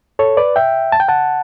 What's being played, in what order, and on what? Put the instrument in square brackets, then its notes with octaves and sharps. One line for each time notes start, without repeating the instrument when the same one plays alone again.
[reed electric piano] A4 C#5
B4 D5
E5 G5
A5
G5
F#5 A5